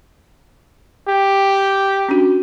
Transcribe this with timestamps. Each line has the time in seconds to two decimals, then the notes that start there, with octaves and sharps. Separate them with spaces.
1.08 G4
2.09 C#4 D4 F#4